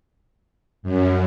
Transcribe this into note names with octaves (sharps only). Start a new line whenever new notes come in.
F#2